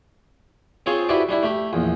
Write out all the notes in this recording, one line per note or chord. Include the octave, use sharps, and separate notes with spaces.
C4 F4 G#4 C5 C#5
E4 F#4 G4 B4 C5 D5
G3 D4 E4
A3 G4
A#1 E2